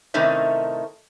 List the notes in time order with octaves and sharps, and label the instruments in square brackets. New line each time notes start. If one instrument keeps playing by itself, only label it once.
[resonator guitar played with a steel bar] A2 C3 D#3 A3 C#4 D#4